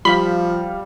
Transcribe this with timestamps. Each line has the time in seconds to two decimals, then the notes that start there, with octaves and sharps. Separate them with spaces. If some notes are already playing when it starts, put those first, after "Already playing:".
0.05 F3 G3 F5 B5